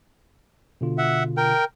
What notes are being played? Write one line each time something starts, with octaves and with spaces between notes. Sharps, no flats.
B2 D3 F4
E5 F#5
A#4 G5